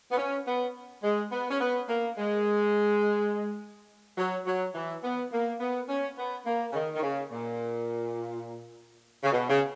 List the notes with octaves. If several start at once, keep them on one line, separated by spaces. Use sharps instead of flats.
B3
C#4
B3
G#3
B3
C#4
B3
A#3
G#3
F#3
F#3
E3
B3
A#3
B3
C#4
B3
A#3
C#3
D#3
D#3
C#3
A#2
C#3
B2
C#3